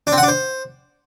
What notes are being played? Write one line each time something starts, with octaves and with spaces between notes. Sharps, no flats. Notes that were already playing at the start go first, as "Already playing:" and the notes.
D4
C4
F#5
D4
C5